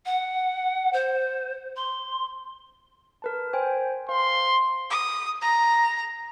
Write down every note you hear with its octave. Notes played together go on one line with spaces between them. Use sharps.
F#5
C5
C6
A#4 B4 A5
C5 G5 G#5
C5 F5 C6
D#6
A#5